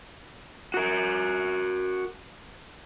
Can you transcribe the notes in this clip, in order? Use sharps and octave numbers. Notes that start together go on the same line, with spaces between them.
F#4 A#4